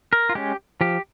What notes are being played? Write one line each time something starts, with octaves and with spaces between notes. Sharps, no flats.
A#4
F4
G#3 C#4 G4
F3 G4